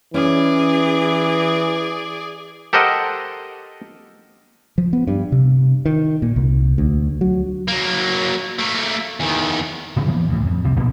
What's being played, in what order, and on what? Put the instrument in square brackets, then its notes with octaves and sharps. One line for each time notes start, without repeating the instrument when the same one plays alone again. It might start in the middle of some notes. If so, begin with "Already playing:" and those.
[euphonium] E3 [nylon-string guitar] C#4 [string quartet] G#4 D5
[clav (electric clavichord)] G4 A4 A#4 C5 D#5 F#5
[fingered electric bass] F3
B3
G2
C3
D#3
A#2
C2
D2
F#3
[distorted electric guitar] F#3 A#3
A3 A#3
E2 D#3
[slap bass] G#2 C#3 E3
E3 F3 A#3 B3
D2 A2
F2
C2 C3
A#1 B2 A#3